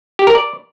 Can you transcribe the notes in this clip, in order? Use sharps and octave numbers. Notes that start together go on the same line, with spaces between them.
G4
A#4
D5